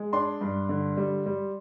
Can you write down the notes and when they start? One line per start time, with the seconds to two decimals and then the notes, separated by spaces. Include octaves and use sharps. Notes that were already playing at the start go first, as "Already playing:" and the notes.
Already playing: G#3
0.13 D4 C6
0.41 G2
0.69 D3
0.97 G3
1.26 G3